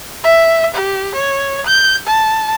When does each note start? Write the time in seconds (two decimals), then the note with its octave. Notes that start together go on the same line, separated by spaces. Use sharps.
0.24 E5
0.74 G4
1.15 C#5
1.66 G6
2.07 A5